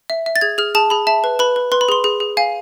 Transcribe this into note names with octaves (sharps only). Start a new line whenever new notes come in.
E5
E5
A6
G#4 G#6
G#4 F6
G#4 A5
G#4 B5
E5 A5
B4
B4 B5
B4
B4 C6
B5
G#4 C6
G#4
G#4
F5 G#5